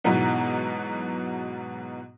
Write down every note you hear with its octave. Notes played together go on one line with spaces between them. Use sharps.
G#2 B2 E3 F#3 B3 D#4